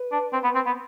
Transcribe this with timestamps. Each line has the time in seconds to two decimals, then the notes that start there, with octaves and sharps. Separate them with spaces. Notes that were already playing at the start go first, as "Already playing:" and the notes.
Already playing: B4
0.12 D4
0.33 C4
0.44 B3
0.55 C4
0.66 B3